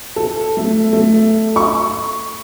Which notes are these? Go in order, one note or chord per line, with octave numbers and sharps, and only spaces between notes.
A4
A3
A3
C#6